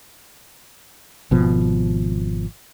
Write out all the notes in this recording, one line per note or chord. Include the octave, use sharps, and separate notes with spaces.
G#1 B2 F3